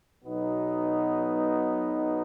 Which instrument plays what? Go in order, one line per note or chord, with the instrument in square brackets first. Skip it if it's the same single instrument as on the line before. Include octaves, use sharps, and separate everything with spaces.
[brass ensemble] B1 B2 F#3 B3 D#4